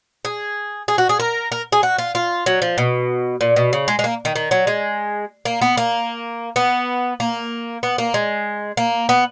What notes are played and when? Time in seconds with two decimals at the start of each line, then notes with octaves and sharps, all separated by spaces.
0.25 G#4
0.88 G#4
0.98 F#4
1.09 G#4
1.20 A#4
1.52 A#4
1.72 G#4
1.83 F#4
1.98 F4
2.15 F4
2.46 F#3
2.62 F3
2.78 B2
3.41 A#2
3.56 B2
3.73 C#3
3.88 G#3
3.99 G#3
4.04 A#3
4.25 D#3
4.36 D#3
4.51 F#3
4.67 G#3
5.45 A#3
5.62 B3
5.77 A#3
6.56 B3
7.20 A#3
7.83 B3
7.98 A#3
8.14 G#3
8.77 A#3
9.09 B3